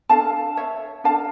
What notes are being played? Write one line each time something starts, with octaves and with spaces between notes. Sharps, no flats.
D4 A4 F5 A5
C#5 E5
D4 A4 F5 A5